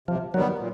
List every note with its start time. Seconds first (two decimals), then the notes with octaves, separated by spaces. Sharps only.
0.08 C3 F3
0.34 D#3 F#3 G3 B3
0.59 A#2